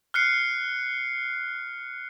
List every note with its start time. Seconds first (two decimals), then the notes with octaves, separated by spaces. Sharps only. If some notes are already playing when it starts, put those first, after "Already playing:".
0.14 F6 F#6 C7 C#7